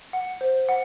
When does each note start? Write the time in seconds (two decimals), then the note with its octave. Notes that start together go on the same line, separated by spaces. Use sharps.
0.13 F#5
0.41 C5
0.69 F#5